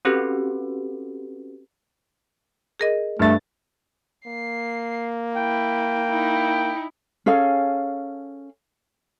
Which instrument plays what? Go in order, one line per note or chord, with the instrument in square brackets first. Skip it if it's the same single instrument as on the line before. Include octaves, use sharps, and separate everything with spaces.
[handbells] C4 C#4 F#4 G4 A4 B4
[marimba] G#4 A#4 D#5
[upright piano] G2 A6 [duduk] A3
[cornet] A#3 [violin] C7
[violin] E4 [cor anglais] G5
[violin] D#4 E4
[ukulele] C#4 G#4 A4 F5